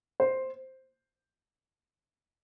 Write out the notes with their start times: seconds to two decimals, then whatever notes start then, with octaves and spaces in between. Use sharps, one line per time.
0.20 C5